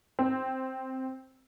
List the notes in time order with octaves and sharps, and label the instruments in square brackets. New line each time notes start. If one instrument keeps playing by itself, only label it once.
[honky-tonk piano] C4